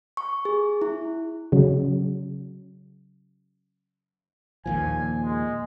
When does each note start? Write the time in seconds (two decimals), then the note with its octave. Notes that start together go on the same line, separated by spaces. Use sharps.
0.17 C#6
0.45 G#4
0.82 E4
1.52 C#3 F#3
4.66 D#2 A#2 F3 G#5
5.24 G#3